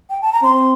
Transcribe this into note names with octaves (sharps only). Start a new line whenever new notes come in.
G5
A5
A#5
C4 C6